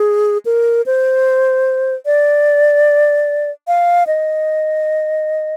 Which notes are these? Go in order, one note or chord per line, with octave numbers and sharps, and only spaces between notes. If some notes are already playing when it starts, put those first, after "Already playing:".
Already playing: G#4
A#4
C5
D5
F5
D#5